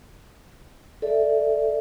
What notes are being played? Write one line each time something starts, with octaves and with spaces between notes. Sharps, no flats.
A4 D5 E5